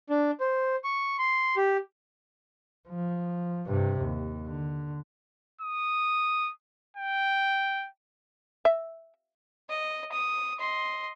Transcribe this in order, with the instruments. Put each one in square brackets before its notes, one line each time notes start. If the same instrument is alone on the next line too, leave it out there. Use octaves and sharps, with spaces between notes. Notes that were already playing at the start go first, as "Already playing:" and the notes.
[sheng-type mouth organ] D4
C5
C#6
C6
G4
[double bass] F3
G2 C3
D#2
D3
[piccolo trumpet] D#6
G5
[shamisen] E5
[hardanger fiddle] D#5
D#6
D#5 C6